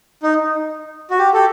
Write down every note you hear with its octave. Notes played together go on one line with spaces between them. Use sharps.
D#4
F#4
G4
G4 A4